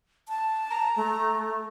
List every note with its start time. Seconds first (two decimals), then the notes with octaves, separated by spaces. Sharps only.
0.29 A5
0.69 A#5
0.96 A3